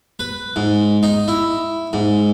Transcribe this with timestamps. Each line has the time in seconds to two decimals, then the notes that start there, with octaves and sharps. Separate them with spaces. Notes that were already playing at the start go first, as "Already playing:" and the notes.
0.19 B4
0.56 G#2
1.03 D#4
1.28 E4
1.93 G#2